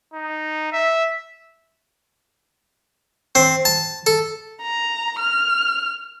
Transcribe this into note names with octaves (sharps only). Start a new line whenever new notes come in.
D#4
E5
C4
A5
A4
A#5
F6